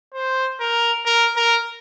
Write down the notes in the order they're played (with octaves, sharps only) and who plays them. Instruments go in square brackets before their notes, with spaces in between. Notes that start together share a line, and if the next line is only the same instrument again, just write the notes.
[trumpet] C5
A#4
A#4
A#4